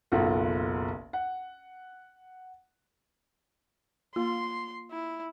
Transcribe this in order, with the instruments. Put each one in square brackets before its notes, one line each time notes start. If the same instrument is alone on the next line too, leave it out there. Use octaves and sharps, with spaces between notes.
[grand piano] F#1 B1 F4 A4 F#5
F#5
[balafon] A#3 [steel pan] F4 [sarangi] C6
[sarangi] E4